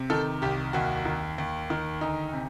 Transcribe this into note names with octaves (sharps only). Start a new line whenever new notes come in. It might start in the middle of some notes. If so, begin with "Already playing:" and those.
Already playing: C3
D#3 A4
C2 G4
D#2 F#4
D#3
D#2
D#3
D2 D#4
C3